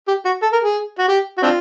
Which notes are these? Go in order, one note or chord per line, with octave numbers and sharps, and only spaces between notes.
G4
F#4
A4
A#4
G#4
F#4
G4
F#4
C4 D4 F4